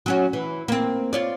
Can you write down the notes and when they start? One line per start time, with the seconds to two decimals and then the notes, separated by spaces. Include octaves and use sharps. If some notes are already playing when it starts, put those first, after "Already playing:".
0.06 F#3 C#4 F#4
0.33 E3
0.68 A#3 C4
1.13 F4 C#5 D5